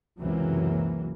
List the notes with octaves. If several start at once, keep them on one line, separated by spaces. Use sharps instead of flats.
C#2 F#2 C3 E3 F#3 A#3